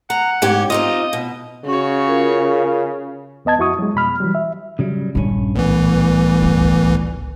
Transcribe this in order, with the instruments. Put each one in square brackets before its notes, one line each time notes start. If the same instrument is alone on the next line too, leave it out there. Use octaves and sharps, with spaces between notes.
[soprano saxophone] F#5 [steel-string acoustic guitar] A#5
[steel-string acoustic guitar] G#2 C#4 G4
[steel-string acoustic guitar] C4 D#4 F4 [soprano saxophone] D#5
[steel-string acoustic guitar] B2
[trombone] C#3 [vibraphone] C#4 [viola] F#4 C#5
[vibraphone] F4 A#4 F5
[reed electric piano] D#2 B3 D#5 A5 G#6
F2 E4 F#4 C#6 D#6
F#3 G#3
F2 B2 B5 F6
E3 F#3 G3
E5
[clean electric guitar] C#3 F#3 G3
[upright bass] A#1 E4 [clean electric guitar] G2 C#4
[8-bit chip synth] C2 E3 [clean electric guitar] A2 B3
[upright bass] G1 C#2